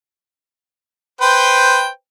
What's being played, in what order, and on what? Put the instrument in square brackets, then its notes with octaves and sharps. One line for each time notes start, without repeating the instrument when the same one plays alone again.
[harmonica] B4 C5 G5